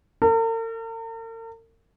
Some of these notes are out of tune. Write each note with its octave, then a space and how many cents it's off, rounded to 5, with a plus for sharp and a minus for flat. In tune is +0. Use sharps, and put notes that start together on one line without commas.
A#4 -45